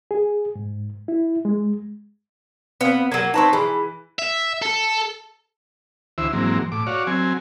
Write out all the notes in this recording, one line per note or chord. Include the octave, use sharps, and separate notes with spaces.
G#4
G#2
E4
G#3
B3 C4 F5
F#3 A#3 G#6
C4 D#4 B4 A5 A#5 C#6
E3 G#4 B5
E5
A4
D2 E3 E4 C5 E5
G#2 E3 F#3 A#3 C4
A2 D6
F#4 C#5 D5 F5
F#3 C4 G#5